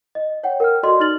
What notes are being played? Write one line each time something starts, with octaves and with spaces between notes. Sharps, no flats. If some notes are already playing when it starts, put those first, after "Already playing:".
D#5
C#5 F#5 G5
A#4 G5 F6
F#4 A4 D5 D#5 C6
D#4 F6 A6 F#7